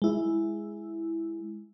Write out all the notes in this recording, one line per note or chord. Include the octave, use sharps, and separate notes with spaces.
G#3 E4